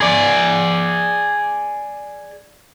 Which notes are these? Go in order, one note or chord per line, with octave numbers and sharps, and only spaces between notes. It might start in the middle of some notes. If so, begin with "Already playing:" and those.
G#4 D5